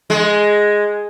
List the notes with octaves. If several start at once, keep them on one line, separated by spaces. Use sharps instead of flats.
G#3